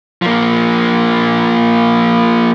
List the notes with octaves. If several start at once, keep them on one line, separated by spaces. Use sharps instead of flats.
F3 A#3